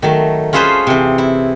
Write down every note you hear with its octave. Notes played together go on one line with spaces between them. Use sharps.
D#3 F#3 A3
C#4 F4 G#4 A4 B4 C5
C3 E3
E4